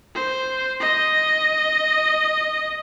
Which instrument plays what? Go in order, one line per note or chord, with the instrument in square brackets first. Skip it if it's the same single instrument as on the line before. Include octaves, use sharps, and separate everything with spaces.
[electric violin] C5
D#5